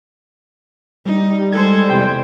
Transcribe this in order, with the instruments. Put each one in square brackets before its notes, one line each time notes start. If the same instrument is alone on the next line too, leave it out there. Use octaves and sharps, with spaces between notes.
[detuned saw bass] G3 [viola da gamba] D#4
[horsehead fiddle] G#3 C5 [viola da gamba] A4 [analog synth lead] G#6
[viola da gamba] E2 C3 [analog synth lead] G5